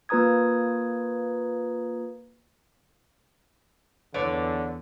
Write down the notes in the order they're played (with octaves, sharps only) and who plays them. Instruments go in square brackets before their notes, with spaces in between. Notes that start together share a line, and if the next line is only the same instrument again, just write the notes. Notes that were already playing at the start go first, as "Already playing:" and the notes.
[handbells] A#3 F4 B4 A#5 D#6 G#6
[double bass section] E2 [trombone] D3 [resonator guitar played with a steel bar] B4 C#5 D5